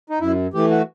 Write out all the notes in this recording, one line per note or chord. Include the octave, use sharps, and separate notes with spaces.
D#4
F#2 E4
E3 A3 G4
F#4